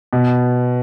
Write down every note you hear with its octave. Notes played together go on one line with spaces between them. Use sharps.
B2